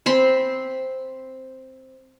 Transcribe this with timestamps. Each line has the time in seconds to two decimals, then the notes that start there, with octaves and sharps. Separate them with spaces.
0.06 C4 B5 C6